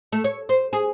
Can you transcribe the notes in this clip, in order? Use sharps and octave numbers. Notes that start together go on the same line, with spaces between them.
A3
C#5
C5
G#4